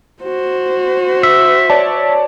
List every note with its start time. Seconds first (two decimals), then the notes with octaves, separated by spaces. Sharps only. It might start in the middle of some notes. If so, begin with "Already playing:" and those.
0.23 F#4 C5
1.23 E5
1.70 C#5 D5 A5